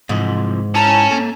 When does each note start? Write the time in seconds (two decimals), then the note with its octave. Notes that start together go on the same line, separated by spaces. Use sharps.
0.09 G#2 C3 E3 F3
0.75 C#4 E4 A5 A#5
1.11 A#3 A4